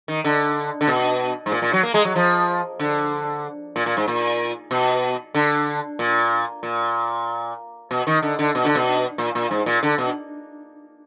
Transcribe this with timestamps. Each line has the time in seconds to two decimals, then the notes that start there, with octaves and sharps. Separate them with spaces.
0.08 D#3
0.24 D3
0.81 D3
0.87 B2
1.46 G#2
1.52 A#2
1.62 A#2
1.73 F#3
1.83 A#3
1.94 G#3
2.05 F#3
2.16 F3
2.80 D3
3.76 A#2
3.86 A#2
3.97 G#2
4.08 A#2
4.71 B2
5.35 D3
5.99 A#2
6.63 A#2
7.91 B2
8.07 D#3
8.23 D3
8.39 D3
8.55 B2
8.65 D3
8.75 B2
9.18 A#2
9.35 A#2
9.51 G#2
9.66 A#2
9.83 D3
9.98 B2